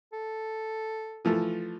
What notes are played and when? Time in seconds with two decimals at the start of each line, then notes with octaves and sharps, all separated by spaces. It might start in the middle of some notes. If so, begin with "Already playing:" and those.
0.13 A4
1.25 E3 F3 A3